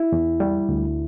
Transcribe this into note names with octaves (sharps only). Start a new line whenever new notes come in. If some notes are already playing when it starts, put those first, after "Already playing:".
Already playing: E4
E2
G3
D2